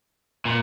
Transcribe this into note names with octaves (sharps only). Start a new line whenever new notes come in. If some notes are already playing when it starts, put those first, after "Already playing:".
A#2